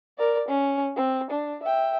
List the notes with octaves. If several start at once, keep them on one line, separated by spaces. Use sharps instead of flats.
A#4 D5
C#4
C4
D4
E5 G5